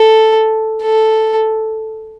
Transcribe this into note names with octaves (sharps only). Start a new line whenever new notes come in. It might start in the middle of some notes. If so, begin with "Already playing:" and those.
Already playing: A4
A4